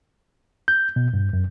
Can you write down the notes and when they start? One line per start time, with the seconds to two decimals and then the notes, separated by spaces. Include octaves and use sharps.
0.68 G6
0.96 B2
1.14 G2
1.33 F#2